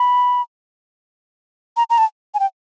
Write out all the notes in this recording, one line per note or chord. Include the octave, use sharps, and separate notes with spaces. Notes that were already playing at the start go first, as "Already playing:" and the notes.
Already playing: B5
A#5
A#5
A5
G#5
G5